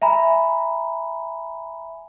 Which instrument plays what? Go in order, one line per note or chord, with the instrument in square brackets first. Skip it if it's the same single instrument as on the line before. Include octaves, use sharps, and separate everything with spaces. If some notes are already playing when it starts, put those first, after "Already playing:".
[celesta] E5 G#5 A#5 B5